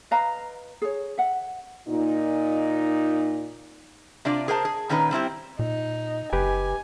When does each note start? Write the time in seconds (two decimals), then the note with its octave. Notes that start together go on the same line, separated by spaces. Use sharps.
0.11 B4 D#5 F5 A#5
0.82 G#4 C#5
1.18 E5 F#5
1.88 A#2 D#4
4.25 C3 D4 F4 D5
4.48 G#4 A#4 C5 F5 A5
4.65 G#4
4.89 A#2 D#3 C#4 A#4 B4
5.11 G3 C4 E4 G4
5.59 A#2 D#4
6.33 F#1 G4 B4 G#5 D6